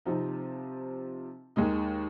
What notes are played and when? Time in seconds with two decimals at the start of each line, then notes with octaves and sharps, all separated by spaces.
0.06 C3 F3 C4 D#4
1.56 D#2 D#3 G#3 D#4